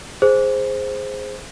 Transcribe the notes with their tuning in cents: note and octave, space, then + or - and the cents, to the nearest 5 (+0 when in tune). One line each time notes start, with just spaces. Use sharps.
G#4 +0 C5 +0